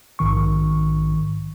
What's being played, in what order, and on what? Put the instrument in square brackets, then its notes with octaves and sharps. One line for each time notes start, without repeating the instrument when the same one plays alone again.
[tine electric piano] A#1 G#2 D#3 C#6